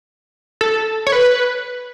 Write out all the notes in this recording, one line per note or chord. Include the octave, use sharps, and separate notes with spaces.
A4
C#5
B4